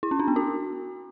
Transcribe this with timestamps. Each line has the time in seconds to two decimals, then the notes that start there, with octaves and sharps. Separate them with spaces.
0.03 E4
0.11 C#4
0.19 D4
0.28 B3
0.36 F#4